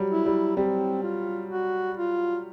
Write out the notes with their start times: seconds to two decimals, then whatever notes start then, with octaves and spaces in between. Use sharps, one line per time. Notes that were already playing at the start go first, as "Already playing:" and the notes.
Already playing: F#3 G3
0.10 E4
0.26 G3
0.57 G3 C4
1.03 F4
1.50 F#4
1.97 F4